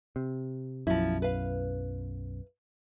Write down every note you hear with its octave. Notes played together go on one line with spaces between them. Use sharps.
C3
B1 F#2 F3 E4
B4 F5